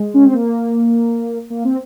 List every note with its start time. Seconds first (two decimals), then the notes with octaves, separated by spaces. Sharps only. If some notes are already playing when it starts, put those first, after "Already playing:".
Already playing: G#3
0.14 C#4
0.24 C4
0.34 A#3
1.50 A#3
1.64 C4